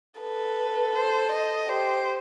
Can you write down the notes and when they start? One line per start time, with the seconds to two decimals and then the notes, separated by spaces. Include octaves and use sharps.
0.20 A4 B4
0.95 C5
1.32 D#5
1.68 G4 C5